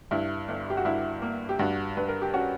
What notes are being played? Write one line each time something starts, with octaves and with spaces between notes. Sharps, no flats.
G2 E4
G1
G4
F#4
G2 E4
A#3
G4
G2 F#4
G2 B4
A#4
G4
C#4 F#4